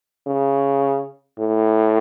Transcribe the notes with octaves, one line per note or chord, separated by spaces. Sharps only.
C#3
A2